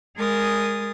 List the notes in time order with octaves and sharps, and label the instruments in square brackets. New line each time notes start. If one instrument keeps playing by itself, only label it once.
[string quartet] G#3 G#4 A#4 D#6 A6